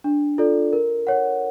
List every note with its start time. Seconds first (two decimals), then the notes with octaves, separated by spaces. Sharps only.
0.04 D4
0.38 F4 A4 D5
0.73 A#4
1.07 C#5 F#5